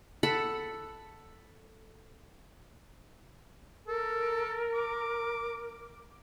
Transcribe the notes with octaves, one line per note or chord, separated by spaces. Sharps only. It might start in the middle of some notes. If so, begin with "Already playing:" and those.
A4 F#5 B5
A4 A#4
D6